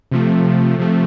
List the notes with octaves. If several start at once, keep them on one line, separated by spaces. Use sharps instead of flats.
C3 F3 A3
C3 F3 A3